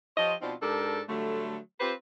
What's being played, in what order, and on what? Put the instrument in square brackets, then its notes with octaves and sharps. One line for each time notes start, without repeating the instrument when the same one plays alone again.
[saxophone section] F3 G4 C5 C#5 D#5
B2 F3 C4 D4 D#4 F4
G#2 D4 G4 A4 A#4
D3 F#3 G3 A3
C4 F4 G4 B4 C5